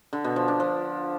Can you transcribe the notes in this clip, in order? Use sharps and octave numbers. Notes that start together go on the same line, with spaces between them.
D3
B2
F3
D4
F3